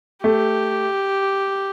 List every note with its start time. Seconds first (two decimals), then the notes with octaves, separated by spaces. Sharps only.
0.24 A3 G4